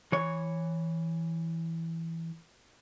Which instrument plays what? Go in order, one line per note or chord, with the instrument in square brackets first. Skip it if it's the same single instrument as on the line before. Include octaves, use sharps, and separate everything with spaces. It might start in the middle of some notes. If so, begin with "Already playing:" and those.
[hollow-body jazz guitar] E3 C#5